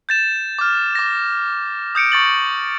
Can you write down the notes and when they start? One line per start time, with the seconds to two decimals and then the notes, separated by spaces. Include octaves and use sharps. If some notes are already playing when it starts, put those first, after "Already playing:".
0.09 G6 A6 E7
0.59 D6 F6
0.95 D6 A#6
1.95 D#6 G6 C#7 D7
2.12 C#6 A6 F#7